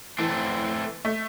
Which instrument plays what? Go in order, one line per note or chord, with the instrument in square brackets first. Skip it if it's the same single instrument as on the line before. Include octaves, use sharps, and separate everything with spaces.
[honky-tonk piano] E3 [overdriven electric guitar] A3 C4
[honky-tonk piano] A3